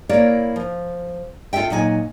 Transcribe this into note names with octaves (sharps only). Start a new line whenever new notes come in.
A#3 E4 A#4 C#5 D5
F3
F4 A4 C5 E5 G5
A#2 F#3 D#4 C#5 G#5